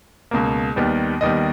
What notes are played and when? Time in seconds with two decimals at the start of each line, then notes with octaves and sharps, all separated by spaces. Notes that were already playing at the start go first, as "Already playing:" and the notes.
0.31 C#2 B2 A#3
0.76 D#2 D#3 G3 B3
1.21 D#2 D#3 G3 B3 D#5